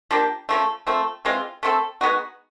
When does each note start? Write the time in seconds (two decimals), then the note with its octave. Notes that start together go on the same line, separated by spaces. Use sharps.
0.11 F3 A#3 D4 G4
0.49 C#3 F3 A3
0.87 F3 A3 C4
1.25 E3 G#3 C4 F4
1.63 A3 C4 F4 A4
2.01 G#3 B3 D#4 F#4